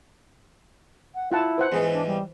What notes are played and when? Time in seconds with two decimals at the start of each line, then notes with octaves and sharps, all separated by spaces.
1.15 F#5
1.32 E4 F4 F#5 A5
1.58 B4 C5 F#5
1.72 E2 G#2 E3 G#4
1.93 D4
2.06 G3